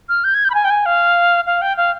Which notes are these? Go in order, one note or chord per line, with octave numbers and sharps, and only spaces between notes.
F6
G6
G#6
G6
B5
G#5
G5
G#5
F5
F5
G5
F5